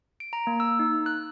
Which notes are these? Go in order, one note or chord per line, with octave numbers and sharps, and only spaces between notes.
D7
A#5
A#3
E6
D#4
F#6